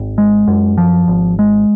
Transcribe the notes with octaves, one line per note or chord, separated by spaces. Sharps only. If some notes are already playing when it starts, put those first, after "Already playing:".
Already playing: G#1
G#3
F#2
F3
G#1
G#3